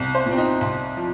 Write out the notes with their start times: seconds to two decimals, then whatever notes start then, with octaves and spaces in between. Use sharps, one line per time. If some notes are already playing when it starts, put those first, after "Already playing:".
Already playing: C2
0.15 C5
0.26 A#2
0.31 C4
0.38 D#4
0.61 C2
0.97 F3